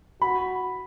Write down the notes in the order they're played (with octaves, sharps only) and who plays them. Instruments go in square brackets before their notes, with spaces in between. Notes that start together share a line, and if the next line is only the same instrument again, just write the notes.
[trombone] F#4 [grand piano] B5